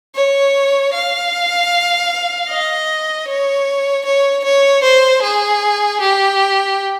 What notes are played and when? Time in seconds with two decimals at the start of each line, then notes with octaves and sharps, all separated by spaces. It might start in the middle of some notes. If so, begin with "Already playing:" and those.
0.15 C#5
0.94 F5
2.49 D#5
3.28 C#5
4.05 C#5
4.44 C#5
4.83 C5
5.22 G#4
6.01 G4